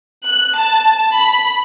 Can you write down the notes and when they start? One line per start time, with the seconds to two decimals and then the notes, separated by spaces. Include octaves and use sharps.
0.24 F#6
0.59 A5
1.14 B5